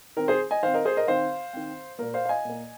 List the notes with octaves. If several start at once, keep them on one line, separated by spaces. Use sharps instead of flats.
D#3 C4 A#4
G#4 C5
D#5 G#5
D#3 C4 C5 F5
A#4 D#5
G#4 C5
A#4 D#5
D#3 C4 C5 F5
D#3 C4
A#2 A#3 A#4
C5 F5
F5
D#5 G#5
A#2 A#3